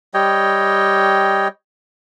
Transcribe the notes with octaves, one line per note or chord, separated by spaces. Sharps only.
G3 C#5 D#5 G5